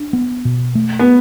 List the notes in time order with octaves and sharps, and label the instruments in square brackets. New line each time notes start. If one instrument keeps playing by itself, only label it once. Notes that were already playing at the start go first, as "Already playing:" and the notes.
Already playing: [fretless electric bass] D4
B3
B2
A3
[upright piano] B3